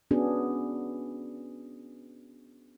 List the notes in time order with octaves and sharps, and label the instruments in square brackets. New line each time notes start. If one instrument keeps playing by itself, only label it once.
[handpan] B3 C#4 D4 F#4 G#4